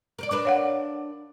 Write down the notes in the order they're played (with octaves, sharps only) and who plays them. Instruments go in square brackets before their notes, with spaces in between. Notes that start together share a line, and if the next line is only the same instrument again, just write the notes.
[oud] A#4 B4 D5
D4 A#4 B4
[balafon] C#5 F5 F#5